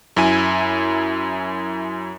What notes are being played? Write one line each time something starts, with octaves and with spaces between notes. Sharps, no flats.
F#2 E4 G#5